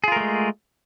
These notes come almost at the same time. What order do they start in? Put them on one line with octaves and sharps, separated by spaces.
G#4 F4 A#4 A3 G#3